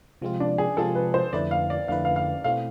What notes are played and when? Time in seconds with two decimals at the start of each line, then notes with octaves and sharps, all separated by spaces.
0.21 C3 F3 G#3 C4 F4
0.40 D4
0.58 G#4
0.77 C3 F3 G#3 C4 F4 A4
0.95 B4
1.14 C5
1.33 F2 D3 A3 E4 B4 D5
1.51 F5
1.70 D5
1.88 F2 D3 A3 E4 B4 F5
2.05 F5
2.16 F5
2.44 B2 A3 C4 E4 F5